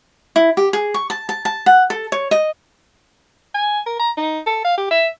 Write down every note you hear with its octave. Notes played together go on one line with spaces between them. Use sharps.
E4
G4
G#4
C#6
A5
A5
A5
F#5
A4
C#5
D#5
G#5
A#4
A#5
D#4
A4
F5
G4
E5